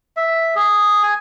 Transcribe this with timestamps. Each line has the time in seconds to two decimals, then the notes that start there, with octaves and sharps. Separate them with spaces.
0.17 E5
0.56 G#4
1.03 G#5